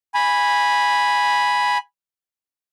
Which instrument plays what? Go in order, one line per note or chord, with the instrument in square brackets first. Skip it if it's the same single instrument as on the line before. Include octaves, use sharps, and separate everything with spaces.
[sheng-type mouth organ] G#5 B5